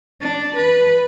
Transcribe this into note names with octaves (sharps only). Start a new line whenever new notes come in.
D4
B4